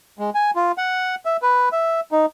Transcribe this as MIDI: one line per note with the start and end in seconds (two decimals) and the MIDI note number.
0.19 0.30 56
0.35 0.51 80
0.56 0.72 65
0.78 1.15 78
1.25 1.37 76
1.42 1.69 71
1.72 2.00 76
2.12 2.26 63